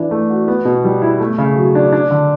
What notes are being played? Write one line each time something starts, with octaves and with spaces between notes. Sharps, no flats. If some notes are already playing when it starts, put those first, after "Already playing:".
Already playing: E3 D4
A3
F#4
B3
B2
G3
E4
A3
C#3
F#3
D4
D4
D3